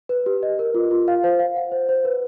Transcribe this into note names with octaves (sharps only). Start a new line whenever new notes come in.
B4
G4
D#5
A#4
F4
F4
F5
C5
F5
F#5
C5
C5
B4